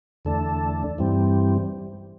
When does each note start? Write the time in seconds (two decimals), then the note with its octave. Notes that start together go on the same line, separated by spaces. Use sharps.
0.25 E2 D3 A3 D4 A4
0.98 G2 E3 G3 C4